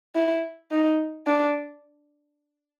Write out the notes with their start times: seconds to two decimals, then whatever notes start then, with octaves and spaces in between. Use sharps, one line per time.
0.15 E4
0.71 D#4
1.27 D4